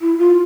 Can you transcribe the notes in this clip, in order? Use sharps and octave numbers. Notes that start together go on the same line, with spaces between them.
E4
F4